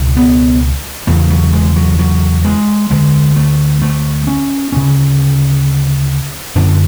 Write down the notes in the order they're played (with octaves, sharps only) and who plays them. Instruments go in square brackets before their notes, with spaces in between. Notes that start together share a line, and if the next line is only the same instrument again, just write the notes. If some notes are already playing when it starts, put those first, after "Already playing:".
Already playing: [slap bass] C#2 B2
B3
E2 C#3 A3
F#3
G#3
F#3
F#3
G#3
D2 D3 G#3
A3
A3
C#4
D2 C#3 C#4
F#2 D3 D4